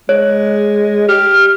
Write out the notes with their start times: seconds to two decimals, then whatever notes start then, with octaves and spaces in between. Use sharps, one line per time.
0.09 G#3 C#5
1.09 G4 F6